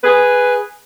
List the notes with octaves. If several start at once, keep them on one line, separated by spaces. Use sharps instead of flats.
G#4 B4